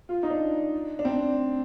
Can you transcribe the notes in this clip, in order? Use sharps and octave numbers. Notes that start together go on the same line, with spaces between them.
F4
D#4
D4
D4
C4